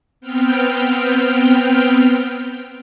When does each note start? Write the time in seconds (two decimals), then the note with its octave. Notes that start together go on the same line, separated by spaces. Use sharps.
0.21 B3 C4 G5 F6